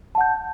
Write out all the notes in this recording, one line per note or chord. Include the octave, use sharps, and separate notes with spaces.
F#5 A5 G6